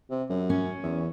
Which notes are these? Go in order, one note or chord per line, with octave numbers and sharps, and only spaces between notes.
C3
F#2
C#4
E2